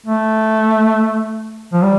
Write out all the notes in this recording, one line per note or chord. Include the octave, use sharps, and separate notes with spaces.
A3
F3
G3